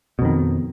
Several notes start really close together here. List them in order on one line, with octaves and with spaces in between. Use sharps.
B2 F2 D#3